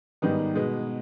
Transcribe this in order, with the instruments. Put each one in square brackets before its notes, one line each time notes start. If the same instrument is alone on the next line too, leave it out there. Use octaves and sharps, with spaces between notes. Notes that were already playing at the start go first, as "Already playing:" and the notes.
[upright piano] G#2 D#3 G3 B3 D#4
B2 G#3 B3